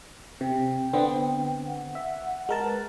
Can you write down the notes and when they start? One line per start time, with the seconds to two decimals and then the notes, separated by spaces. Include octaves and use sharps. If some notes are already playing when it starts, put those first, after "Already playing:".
0.41 C3 G5
0.93 D3 B3 C4
1.67 F#5
1.95 E5
2.49 G#3 A#4 A5
2.63 B4